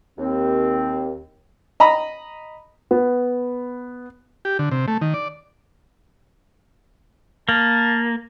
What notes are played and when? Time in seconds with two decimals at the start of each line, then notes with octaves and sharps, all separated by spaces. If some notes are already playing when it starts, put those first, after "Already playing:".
0.18 D#2 C4
1.80 D#5 A#5 B5
2.91 B3
4.45 G4
4.59 D3
4.71 C3
4.88 A3
5.02 D#3
5.14 D5
7.49 A#3 A5